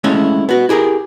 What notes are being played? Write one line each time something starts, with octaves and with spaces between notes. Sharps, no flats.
G#3 A3 C#4 E4 C#5
B3 F#4
E4 G4 G#4 A#4